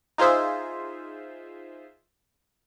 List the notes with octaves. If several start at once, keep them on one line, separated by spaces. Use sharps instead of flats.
D#4 F4 G#4 C5 E5